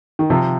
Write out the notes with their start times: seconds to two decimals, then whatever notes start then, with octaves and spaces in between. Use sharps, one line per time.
0.19 D#3
0.30 C3 F3